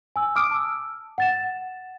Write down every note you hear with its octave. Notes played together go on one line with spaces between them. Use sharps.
G#5 E6
D6 D#6 F6 D7
A5 E6
F#5 A6 E7